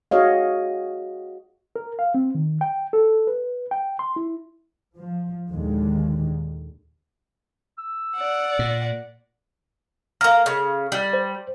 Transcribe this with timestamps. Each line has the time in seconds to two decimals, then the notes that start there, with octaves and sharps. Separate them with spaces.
0.11 F#4 G#4 C#5 D#5 F5
1.76 A#4
1.99 F5
2.14 C4
2.35 D#3
2.61 G5
2.93 A4
3.27 B4
3.71 G5
3.99 C6
4.16 E4
4.97 F3
5.50 D#2 A#2 D3 D#3 G#3
7.78 E6
8.17 D5 F#5
8.59 A#2
10.21 A#3 A#5 F6
10.46 C#3
10.92 G3
11.13 C5